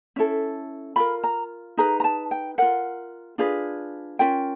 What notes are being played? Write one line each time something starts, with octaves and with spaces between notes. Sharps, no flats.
C#4 E4 A4
F4 A#4 B5
A#5
D#4 G#4 B4 A#5
A#5
A5
G5
F4 A#4 F#5
D4 F4 G#4 B4
C#4 F4 A#4 G5